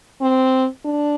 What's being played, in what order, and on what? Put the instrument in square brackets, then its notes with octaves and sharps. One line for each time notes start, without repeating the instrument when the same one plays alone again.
[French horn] C4
D4